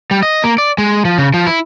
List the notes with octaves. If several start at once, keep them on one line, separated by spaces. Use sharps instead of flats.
G3
D#5
A#3
D5
G#3
F3
C#3
F3
E4